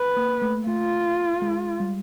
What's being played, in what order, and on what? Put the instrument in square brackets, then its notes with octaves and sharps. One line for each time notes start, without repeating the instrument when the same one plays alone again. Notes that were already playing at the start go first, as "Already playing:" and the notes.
Already playing: [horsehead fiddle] B4
[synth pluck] A#3
A3
[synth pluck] A3 [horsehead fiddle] F4
[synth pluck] G#3
G3